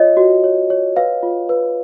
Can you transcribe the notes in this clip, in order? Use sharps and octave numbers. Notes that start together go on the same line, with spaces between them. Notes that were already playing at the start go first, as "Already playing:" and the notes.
Already playing: F4 C#5 D#5
F#4
C#5
C#5
B4 F5
F4
B4